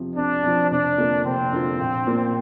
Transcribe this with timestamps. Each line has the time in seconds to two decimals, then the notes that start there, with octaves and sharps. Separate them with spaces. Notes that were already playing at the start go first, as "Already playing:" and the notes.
Already playing: F2 C3 F3
0.16 F2 D4
0.43 C3 F3
0.70 F1 D4
0.98 F2 D3 A#3 F4
1.25 F1 C4
1.52 F2 D3 A#3 F4
1.79 A#1
2.07 A#2 A#3 F4